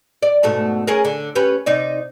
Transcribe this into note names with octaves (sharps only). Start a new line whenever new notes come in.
D5
G#2 B2 A3
C#4 G#4 A#4
D3
C#4 G4 B4
C3 D#4 D5